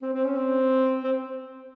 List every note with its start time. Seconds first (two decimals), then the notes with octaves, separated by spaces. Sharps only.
0.02 C4
0.13 C4
0.25 C#4
0.36 C4
1.03 C4